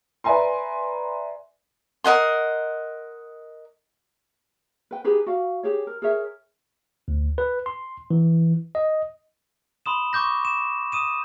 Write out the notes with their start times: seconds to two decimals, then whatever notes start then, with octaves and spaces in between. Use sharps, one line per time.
0.24 B4 D5 E5 G#5 A#5 C6
2.04 A#4 D#5 F#5 C6
4.91 B4 G5
5.04 D#4 G4 G#4 B4
5.26 F#4 D5 F5
5.63 G4 G#4 C#5
5.87 A#4
6.02 G#4 A#4 C#5 E5
7.08 D2
7.38 B4
7.66 C6
8.11 E3
8.75 D#5
9.86 B5 C6 D#6 E7
10.13 C#6 D6 G6 A#6
10.45 E7
10.92 D#6 D#7 E7